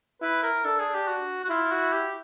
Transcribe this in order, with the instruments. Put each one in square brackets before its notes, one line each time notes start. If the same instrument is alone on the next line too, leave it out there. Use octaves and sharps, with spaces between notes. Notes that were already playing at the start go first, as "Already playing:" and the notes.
[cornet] E4 [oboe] B4
[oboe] A#4
[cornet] D4 [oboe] A4
[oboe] G#4
G4
F#4
F#4
[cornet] E4 [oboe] F4
[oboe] F#4
G4